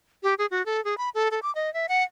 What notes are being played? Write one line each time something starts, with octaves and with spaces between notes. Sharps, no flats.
G4
G#4
F#4
A4
G#4
B5
A4
A4
D6
D#5
E5
F#5